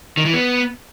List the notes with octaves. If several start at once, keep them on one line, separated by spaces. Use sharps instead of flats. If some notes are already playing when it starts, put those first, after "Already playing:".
D#3
E3
B3